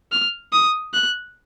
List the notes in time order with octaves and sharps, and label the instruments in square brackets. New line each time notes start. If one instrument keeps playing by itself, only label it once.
[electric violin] F6
D#6
F#6